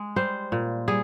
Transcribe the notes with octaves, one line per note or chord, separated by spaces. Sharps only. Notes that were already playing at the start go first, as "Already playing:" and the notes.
Already playing: G#3
G3 C5
A#2
G3 G#4